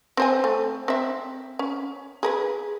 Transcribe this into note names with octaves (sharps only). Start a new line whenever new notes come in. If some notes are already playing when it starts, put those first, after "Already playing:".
C4 C5 G#5
A3
C4 E5
C#4
G#4 A#4 B4